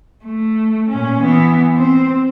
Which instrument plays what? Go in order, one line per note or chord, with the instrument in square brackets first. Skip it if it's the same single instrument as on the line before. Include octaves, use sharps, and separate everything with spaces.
[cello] A3
A#2 C#4
E3 B3
C4